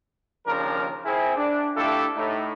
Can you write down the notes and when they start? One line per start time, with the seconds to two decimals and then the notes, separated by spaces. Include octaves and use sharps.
0.46 D#2 C#3 F3 D4 A#4
1.05 C4 E4 G#4
1.36 D4
1.76 A3 D4 E4 F4 G4 A4
2.16 A2 A3 D#4